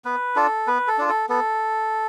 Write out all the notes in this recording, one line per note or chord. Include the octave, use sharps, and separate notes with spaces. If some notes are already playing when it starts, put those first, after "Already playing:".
B3 B4
D4 F4 A4
B3 B4
A4
D4 F4
A4
B3 A4